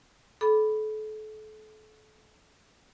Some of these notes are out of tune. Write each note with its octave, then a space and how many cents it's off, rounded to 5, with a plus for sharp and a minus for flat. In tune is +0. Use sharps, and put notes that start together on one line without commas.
A4 -35 B5 +0 D6 +0